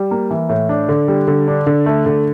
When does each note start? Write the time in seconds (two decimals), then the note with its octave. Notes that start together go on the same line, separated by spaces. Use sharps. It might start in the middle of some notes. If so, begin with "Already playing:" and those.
Already playing: G3
0.11 A#3
0.31 E3
0.49 A2
0.69 D4
0.89 D3
1.08 G3
1.28 D3
1.48 D4
1.67 D3
1.86 A3
2.06 D3